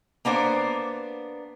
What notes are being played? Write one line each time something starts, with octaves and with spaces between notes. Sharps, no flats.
A#3 B3 D4 C5